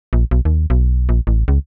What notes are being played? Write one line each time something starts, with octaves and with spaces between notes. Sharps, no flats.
A#1
B1
D#2
B1
A#1
A1
C#2